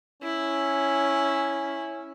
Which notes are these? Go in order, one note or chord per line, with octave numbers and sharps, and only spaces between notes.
C#4 E4